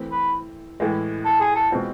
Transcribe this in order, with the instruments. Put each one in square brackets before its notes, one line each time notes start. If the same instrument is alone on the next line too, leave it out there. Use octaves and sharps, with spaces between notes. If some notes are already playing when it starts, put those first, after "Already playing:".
Already playing: [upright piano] E3 A3 C4
[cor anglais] B4
[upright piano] A2 E3 G#3
[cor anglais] A4
G#4
A4
[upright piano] B2 G#3 C4 F4